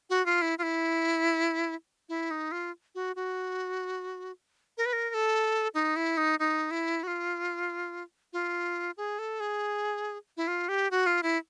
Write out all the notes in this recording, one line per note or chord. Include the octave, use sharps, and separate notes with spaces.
F#4
F4
E4
F4
E4
E4
D#4
F4
F#4
F#4
A#4
B4
A#4
A#4
A4
D#4
E4
D#4
D#4
E4
F#4
F4
F4
G#4
A4
G#4
E4
F4
G4
F#4
F4
E4